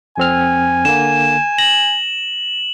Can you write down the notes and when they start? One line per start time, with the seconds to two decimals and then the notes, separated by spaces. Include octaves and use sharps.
0.18 F2 C4 G#5 F6
0.85 D3 A#3 E7
1.58 A#6 F#7